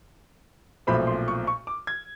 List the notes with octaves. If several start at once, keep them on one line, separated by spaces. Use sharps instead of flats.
B1 A#2 F3 A3 C4 B5
C6
C#6
C#6
D6
G#6